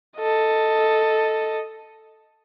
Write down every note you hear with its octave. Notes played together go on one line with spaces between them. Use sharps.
A4 D#5